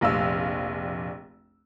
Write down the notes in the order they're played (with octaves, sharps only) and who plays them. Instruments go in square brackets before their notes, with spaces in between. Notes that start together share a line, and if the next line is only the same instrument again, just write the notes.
[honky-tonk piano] F1 A#1 F5 E6